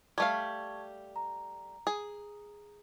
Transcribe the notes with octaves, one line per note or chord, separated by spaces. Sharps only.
G3 A3 F5 A5 C#6 G#6
A#5
G#4